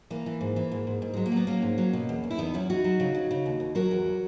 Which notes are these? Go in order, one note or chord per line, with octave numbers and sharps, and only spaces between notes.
E3 A#3
E3
G#2
E3
G#2
G#2
G#2
F#3 G#3
A#3
F#3 B3
F#3 A#3 C#4
G#2
F#3
B2
E2
E2
E4
E2 B3 D#4
F#3 C#4 E4
E2 D#4 F#4
F#3
C#3
C#3
C#3
D#2
D#2
F#3 F#4 A#4
E2
F#3